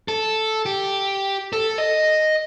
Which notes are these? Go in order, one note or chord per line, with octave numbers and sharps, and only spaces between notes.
A4
G4
A4
D#5